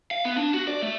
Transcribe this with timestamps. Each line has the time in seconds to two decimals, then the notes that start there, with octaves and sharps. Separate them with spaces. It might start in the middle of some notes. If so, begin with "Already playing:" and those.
0.11 F5
0.25 B3
0.37 D4
0.54 F#4
0.67 D5
0.82 A3